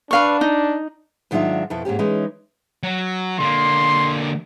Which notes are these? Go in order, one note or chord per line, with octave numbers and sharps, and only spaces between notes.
D4 B4 F5 C#6
D#4
G#2 D#3 F#3 D4 F4 E5
F2 B2 E4 A4
G#2 A#3 C#4 G4
E3 G#3 C#4 D#4
F#3
D3 A#3 C6